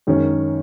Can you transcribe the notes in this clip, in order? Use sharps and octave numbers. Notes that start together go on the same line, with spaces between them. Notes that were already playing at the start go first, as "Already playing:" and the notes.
F#2 D#3 G#3 C#4